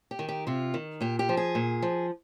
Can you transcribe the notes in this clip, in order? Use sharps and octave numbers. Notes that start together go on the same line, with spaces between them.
G4
D#3
G4
C3 F4
D#3
A#2 G4
G4
F3
G#4
A#2
F3